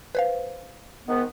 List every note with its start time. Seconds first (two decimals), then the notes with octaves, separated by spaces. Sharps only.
0.15 B4 C5 F5
1.08 G#2 D#3 B3